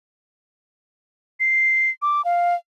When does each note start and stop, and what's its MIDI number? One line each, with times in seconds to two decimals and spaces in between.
1.40 1.90 96
2.02 2.22 86
2.25 2.55 77